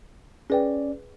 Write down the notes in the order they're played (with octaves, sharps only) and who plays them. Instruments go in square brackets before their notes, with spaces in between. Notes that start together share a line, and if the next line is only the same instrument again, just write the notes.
[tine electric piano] C#4 D5 [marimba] G#4 B4 G5